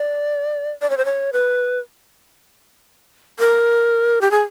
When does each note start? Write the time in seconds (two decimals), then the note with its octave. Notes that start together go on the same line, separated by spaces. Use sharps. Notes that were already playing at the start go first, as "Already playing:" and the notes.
Already playing: D5
0.82 D5
0.90 C#5
0.97 C5
1.05 C#5
1.33 B4
3.39 A#4
4.21 G4
4.31 G#4